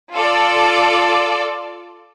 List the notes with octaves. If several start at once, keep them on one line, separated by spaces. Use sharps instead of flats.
F4 A4 D5